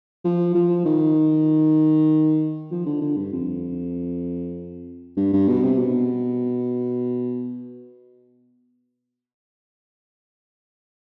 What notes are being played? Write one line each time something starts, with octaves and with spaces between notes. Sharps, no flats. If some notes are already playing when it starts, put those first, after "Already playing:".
F3
F3
D#3
F3
D3
D3
G2
F2
G2
G2
B2
C3
B2